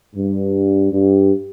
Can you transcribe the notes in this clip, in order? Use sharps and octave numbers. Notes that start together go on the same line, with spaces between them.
G2
G2